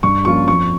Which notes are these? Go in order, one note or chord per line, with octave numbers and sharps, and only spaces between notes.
G2 C#6
F3 A#3 C#4 F4 C#6
F2 C#6